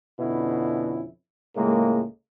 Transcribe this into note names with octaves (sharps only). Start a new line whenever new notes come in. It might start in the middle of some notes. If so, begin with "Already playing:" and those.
F2 B2 D3 C#4 E4
C#2 A2 G#3 A#3